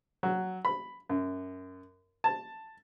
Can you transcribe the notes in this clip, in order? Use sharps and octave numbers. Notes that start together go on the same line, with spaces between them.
F#3
B5
F#2
A5